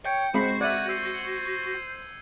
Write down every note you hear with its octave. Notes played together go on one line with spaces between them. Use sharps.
C#5 G5 G6 C#7
G#3 C4 F#4 C5 B5
D5 E5 F#5 G#6 D#7 F#7
C5 E6 C7